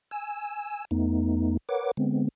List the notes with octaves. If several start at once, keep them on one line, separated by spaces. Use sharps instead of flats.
G#5 E6
E2 A3 B3 D#4
A#4 B4 C#5 F#5 D6
D3 G#3 B3 C4